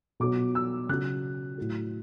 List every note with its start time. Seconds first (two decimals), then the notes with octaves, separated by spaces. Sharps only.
0.20 B2 F#3 D6
0.55 E6
0.89 C#3 F#3 F#6
1.58 A2 F#3